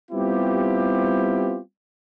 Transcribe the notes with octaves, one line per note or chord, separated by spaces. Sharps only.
G3 B3 C4 E4 F4 G4